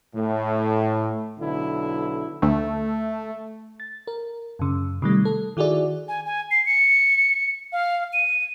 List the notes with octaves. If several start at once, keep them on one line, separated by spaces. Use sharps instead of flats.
A2
B1 D3 E4
D2 A3
A6
A#4
F#2 C#3
C3 D#3 G3 A3
A4
D#3 E4 F#4 G#4 D5
G#5
G#5
C7
C#7
F5
D#7